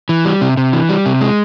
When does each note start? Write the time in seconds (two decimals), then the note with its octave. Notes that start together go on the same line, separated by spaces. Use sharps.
0.09 E3
0.25 G3
0.41 C3
0.57 C3
0.73 E3
0.89 G3
1.06 C3
1.21 G#3